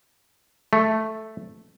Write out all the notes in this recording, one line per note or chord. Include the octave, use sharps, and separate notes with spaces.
A3